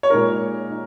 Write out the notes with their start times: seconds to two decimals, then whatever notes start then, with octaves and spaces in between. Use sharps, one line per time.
0.03 C#5
0.10 A#2 G#3 D#4 A#4
0.70 D#4